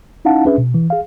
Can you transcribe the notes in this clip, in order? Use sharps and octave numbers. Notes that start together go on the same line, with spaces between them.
C#4 D#4 E4 F5 F#5 A5
C#4 D4 G#4 B4 E5
B2
E3
G#4 F5